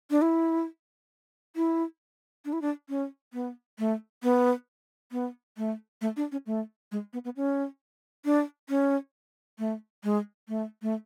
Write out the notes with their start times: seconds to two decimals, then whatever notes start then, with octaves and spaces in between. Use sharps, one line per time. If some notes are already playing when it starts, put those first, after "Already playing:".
0.11 D4
0.22 E4
1.56 E4
2.45 D4
2.53 E4
2.62 D4
2.89 C#4
3.33 B3
3.79 A3
4.23 B3
5.12 B3
5.58 A3
6.01 A3
6.17 D4
6.32 C#4
6.46 A3
6.92 G#3
7.13 B3
7.25 B3
7.36 C#4
8.25 D4
8.69 C#4
9.59 A3
10.04 G#3
10.48 A3
10.82 A3